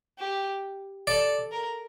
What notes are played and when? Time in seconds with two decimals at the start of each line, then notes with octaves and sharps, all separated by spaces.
0.19 G4
1.07 A4 D5
1.52 A#4